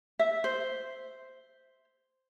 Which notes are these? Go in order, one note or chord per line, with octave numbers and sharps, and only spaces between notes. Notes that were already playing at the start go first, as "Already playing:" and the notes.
E5
C5